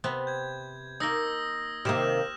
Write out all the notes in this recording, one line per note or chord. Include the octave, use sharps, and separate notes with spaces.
C3 B3 C4
G6 G#6
A#3 D#4 D#6 E6 A#6
C3 D#3 A#3 G4 C5 F6 E7